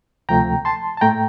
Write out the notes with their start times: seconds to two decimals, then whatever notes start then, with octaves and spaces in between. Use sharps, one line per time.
0.29 D2 C3 F3 A3 G5 A#5
0.65 A5 C6
0.97 A5
1.01 A2 A3 G5 A#5